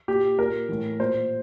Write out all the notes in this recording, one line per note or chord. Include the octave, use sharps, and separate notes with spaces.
A#2 G4
A#2 A#4
A2 E3
A#2 C5